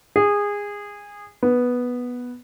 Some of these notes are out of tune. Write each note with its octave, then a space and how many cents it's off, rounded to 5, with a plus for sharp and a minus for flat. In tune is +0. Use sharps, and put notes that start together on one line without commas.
G#4 -20
B3 -5